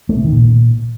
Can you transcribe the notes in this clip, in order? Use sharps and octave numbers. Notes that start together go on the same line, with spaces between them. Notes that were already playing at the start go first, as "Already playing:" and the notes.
A3
C3
D#3
A#2